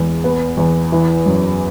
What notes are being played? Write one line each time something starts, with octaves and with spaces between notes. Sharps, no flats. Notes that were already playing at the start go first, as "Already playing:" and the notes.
Already playing: E2 G#3
B3
E2
E3
F#2